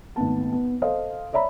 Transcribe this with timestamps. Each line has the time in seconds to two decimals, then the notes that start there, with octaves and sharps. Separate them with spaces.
0.16 G#1 A2 B3 A5
0.52 B3
0.82 A4 C5 D#5 F5
1.33 C#5 D5 E5 A#5 B5